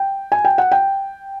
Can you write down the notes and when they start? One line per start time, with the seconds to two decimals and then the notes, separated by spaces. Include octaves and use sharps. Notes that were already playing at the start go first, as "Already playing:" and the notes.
Already playing: G5
0.32 G#5
0.45 G5
0.58 F#5
0.72 G5